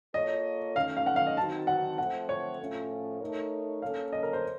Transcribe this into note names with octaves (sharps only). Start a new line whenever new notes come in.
A#3 F4 A4 C#5 D#5
D#3 A3 C#4 F5
F5
F#5
F5
D#5
D#3 F#3 C4 D#4 F#4 A5
F#5
F3 A3 C4 F#5
C#5
A2 F3 A3 C#4 F4
A3 D#4 A#4 C#5
A#3 C#4 A4 C#5 F5
D#5
A#4
C5